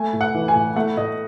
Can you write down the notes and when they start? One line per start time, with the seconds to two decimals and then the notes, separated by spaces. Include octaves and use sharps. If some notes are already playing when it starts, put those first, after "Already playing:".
Already playing: A3 G#5
0.13 A2
0.21 F#5
0.34 E3
0.48 G#5
0.55 A2
0.76 A3 F#5
0.97 A2 D#5